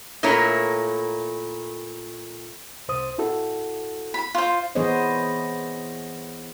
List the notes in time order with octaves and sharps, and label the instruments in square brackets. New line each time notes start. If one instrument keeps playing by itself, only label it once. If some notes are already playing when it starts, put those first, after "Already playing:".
[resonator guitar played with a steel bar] A#2 A3 E4 A#4 C#5
[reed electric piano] C2 C5 D#6
E4 F#4 A4
[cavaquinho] B5
F4 C5
[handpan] E3 B3 G#4 C5 C#5 D#5